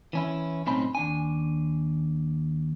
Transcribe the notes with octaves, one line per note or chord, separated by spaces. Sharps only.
E3 C#4 E4
B1 A2 C4 C#4 D#4 B5
D#2 D4 G#5